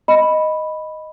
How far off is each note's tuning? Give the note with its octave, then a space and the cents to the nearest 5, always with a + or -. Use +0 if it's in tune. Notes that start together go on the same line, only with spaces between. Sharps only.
D#5 +0 B5 +0